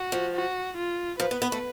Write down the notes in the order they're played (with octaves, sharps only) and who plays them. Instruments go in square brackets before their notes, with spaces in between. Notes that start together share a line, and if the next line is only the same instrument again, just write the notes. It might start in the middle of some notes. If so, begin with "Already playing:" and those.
Already playing: [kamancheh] F#4
[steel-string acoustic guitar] F3
[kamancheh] F#4
F4
[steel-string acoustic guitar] F3 [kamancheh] B4
[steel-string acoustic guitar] B3
B3
A3